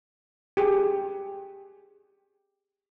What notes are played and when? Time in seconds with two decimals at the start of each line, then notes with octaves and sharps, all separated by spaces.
0.57 G4 G#4